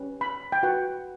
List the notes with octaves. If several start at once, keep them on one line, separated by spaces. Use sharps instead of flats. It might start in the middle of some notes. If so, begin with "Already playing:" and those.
Already playing: C#4 G4 B4
B5
G5
F#4 B4 F#5